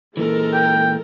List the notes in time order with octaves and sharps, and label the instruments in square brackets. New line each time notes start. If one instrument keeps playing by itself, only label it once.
[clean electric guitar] A#2 E3 [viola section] G#3 A4 A#4
[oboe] G5